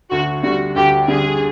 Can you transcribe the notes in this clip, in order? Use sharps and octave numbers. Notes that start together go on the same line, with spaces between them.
D2 F#4
D3 G3 F#4
D2 G4
D3 G3 G#4